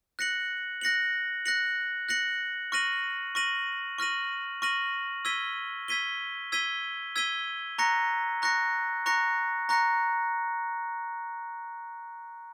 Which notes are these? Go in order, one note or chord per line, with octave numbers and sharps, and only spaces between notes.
F#6 A#6 C#7 F#7
F#6 A#6 C#7 F#7
F#6 A#6 C#7 F#7
F#6 A#6 C#7 F#7
C#6 F6 A#6 D#7 F#7
C#6 F6 A#6 D#7 F#7
C#6 F6 A#6 D#7 F#7
C#6 F6 A#6 D#7 F#7
E6 G#6 B6 D#7 G7
E6 G#6 B6 D#7 G7
E6 G#6 B6 D#7 G7
E6 G#6 B6 D#7 G7
A#5 C#6 F#6 A#6 C#7
A#5 C#6 F#6 A#6 C#7
A#5 C#6 F#6 A#6 C#7
A#5 C#6 F#6 A#6 C#7